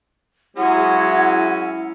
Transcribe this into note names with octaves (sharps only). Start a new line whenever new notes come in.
F#3 G#3 C#4 E4 F#5